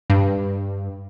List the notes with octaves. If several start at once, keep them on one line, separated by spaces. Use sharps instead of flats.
G2